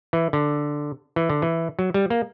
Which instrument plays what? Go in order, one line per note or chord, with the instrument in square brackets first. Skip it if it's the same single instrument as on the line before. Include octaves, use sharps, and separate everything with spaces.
[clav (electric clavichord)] E3
D3
E3
D3
E3
F#3
G3
A#3